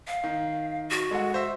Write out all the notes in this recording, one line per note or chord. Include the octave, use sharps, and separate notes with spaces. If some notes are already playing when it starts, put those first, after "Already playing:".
F5
D#3
F#4
G#3 A4 F#5
C5 E5